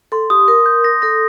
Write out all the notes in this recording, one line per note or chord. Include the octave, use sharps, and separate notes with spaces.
A4 C6
G4 D#6
A#4 D#6
G6
A#6
A4 A#6